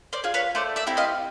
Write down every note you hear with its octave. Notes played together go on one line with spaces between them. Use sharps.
C5 D5
F4 G#4
B4 C#5
A3 C5 D5
D5 E5
C4 E4 G4
D#5 F5